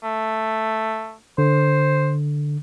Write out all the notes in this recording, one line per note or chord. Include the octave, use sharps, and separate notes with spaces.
A3
D3 C5